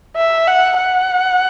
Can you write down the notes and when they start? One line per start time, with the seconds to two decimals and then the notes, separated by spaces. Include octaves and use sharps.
0.16 E5
0.47 F#5
0.77 F#5